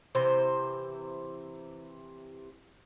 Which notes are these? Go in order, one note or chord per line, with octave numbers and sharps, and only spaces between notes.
C3 E3 C5